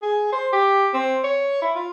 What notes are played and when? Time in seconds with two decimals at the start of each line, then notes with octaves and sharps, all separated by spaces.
0.02 G#4
0.32 C5
0.53 G4
0.94 C4
1.24 C#5
1.62 E4
1.75 F4